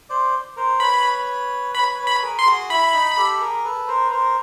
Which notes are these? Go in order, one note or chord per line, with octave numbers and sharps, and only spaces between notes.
C5 D5
A#4 C5
B4 C#5 B5
B4 C#5 B5
B4 C#5
B5
G#4 A#4
C6
F#4 G#4
E4 B5
D#4
G4 A4
G#4 A#4
A4 B4
A#4 C5
B4
A#4 C5